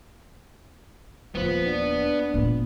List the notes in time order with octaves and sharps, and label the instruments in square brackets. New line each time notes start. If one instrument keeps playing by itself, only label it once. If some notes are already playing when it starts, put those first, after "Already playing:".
[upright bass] D#1 [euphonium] F3 [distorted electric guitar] B3 B4
[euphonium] D4
[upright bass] A#2 B3